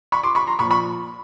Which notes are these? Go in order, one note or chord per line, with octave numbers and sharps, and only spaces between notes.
B5 C#6
C6 D6
B5 C#6
A#5 C6
A#2 F3 B5 C#6
B5 C#6